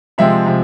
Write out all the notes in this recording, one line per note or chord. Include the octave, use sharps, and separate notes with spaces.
C3 F3 G#3 C4 E5
C3 F3